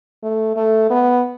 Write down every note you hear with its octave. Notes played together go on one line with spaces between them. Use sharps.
A3
A3
B3